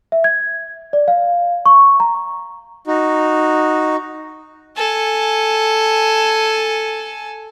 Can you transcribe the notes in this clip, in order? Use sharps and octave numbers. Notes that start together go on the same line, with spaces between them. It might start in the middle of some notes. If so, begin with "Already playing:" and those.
E5
G#6
D5
F5
C#6
A#5
D#4 F#4
A4 G#5